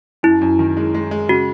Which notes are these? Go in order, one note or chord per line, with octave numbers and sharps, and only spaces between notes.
F#2 E4
F#2
D#3
G#3
G#3
G#3
C#3 F#4